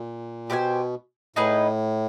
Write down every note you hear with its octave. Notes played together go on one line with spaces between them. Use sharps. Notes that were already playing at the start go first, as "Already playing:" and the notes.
Already playing: A#2
B2 G4 C5 F5 G#5
A2 D#4 G#4 B4 D#5